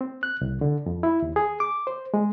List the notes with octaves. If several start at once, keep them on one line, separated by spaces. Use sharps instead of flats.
C4
F#6
C2
D3
F2
E4
D#2
G#4
D6
C5
G#3